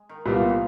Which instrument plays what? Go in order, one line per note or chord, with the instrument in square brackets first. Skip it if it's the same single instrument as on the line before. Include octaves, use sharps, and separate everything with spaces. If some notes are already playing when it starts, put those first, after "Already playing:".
Already playing: [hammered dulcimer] G#3
D#3
[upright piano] C2 A#2 G3 B3 [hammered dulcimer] F3
[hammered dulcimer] E3
D#3